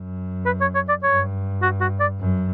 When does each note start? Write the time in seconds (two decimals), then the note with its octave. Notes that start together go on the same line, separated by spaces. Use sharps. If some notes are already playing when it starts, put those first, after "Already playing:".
Already playing: F#2
0.46 B4
0.61 C#5
0.75 C#5
0.89 D5
1.03 G2 C#5
1.62 F#4
1.81 F#4
2.00 D5
2.20 F#2